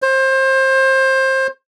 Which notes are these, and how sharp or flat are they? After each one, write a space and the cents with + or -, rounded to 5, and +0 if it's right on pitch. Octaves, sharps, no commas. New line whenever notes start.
C5 +25